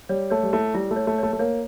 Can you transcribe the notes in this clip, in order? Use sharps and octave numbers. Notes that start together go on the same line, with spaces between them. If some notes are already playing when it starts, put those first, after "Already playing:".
G3 C#5
A3 C#5
G3
A3 E4
G3 E4
A3
C#5
A3
A3 C#5
A3
A#3 C#5